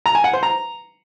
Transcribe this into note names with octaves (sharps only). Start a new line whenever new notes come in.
A#5
G#5
F#5
C5
A#5